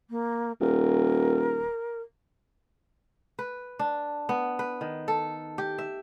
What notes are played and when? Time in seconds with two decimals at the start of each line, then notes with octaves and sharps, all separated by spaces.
0.10 A#3
0.61 D#1 A#4
3.39 B4
3.79 D4
4.29 B3
4.59 B4
4.81 D#3
5.08 A4
5.58 G4
5.78 E5